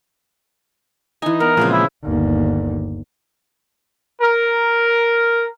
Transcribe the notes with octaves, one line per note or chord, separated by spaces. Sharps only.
E3 D#4 G#5
B3 A#4
A#2 C#3 F3 G#3 C4 B4
E4
G1 D#2
A#4